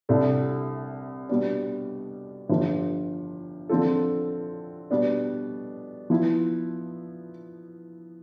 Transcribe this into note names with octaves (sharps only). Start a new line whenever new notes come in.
C2 C3 G3 D4 A4
B2 G3 B3 D4
G1 G2 F3
D3 F3 C4 F4 A4
B2 G3 B3 D4
F3 B3 E4